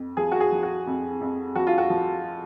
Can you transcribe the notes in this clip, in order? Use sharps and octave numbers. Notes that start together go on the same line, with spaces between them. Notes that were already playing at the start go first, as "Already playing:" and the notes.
Already playing: F2
F3 G#4
F#4
G#4
F3
F#4
F2
F2
F3 F#4
F4
F#4
F3